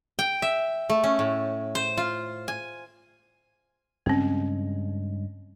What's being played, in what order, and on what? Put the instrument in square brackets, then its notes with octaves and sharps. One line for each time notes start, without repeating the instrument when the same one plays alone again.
[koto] G5
E5
A3
C#4
A2
C5
F4
G#5
[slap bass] G2 C#3 G#3 [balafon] C4 C#4